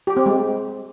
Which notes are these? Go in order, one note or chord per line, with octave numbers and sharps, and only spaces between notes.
G4
C4
G#3